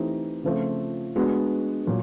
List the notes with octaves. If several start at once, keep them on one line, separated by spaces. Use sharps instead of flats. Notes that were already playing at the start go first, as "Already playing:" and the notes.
Already playing: E3 A3 C4 D#4 G4
C#3 F3 A3 C4 F4
G#3 B3 D4 F#4
A#2 F#3